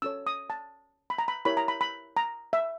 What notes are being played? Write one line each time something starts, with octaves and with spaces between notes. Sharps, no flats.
C#4 F#4 A4 C#5 E6
D#6
A5
B5
A#5
B5
E4 G4 A#4 C#5 B5
A#5
B5
B5
A#5
E5